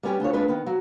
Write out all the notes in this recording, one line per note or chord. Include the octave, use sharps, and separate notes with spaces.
G3 B3 C#4 G4
D2 D4 F4 C#5
G#3 D4 F4 B4
D#3 B3
F#3